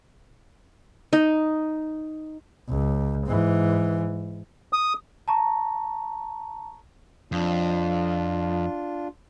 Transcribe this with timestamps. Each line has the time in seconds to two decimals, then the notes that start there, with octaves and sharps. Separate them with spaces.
1.13 D#4
2.68 C#2
3.26 G#2 E3
4.73 D#6
5.28 A5 A#5 C#6
7.32 F2 D4 F4